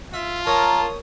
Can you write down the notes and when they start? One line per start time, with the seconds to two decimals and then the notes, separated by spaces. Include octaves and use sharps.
0.14 F4 E5
0.47 A#4 C#5 A5 D#6